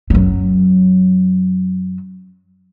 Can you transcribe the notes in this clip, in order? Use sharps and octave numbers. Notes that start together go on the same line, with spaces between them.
F#2 F#3